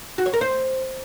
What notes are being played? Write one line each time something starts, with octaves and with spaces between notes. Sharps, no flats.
F#4
C#5
A#4
C5